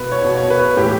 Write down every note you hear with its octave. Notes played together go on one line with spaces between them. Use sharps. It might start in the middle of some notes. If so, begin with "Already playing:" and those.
Already playing: B2 B4
C#5
B2
C#5
B4
A2 E3 G4